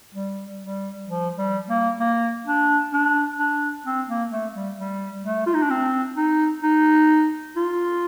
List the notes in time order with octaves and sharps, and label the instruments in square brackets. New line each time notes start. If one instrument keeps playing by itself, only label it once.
[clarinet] G3
G3
F3
G3
A#3
A#3
D4
D4
D4
C4
A#3
A3
G3
G3
A3
F4
D#4
D4
C4
D#4
D#4
F4